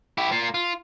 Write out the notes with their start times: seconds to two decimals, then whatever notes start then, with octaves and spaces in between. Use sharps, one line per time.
0.18 E4 G4
0.32 A#3 F4
0.54 F4